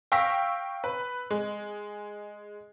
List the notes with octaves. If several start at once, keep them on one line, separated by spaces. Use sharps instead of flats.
F5 G5 C#6 E6 A#6 B6
B4
G#3